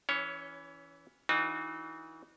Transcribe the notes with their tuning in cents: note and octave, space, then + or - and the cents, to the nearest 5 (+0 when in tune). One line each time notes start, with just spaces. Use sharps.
E3 +0 C#4 +25 C#5 +0
E3 -30 D#4 -40 F#4 -30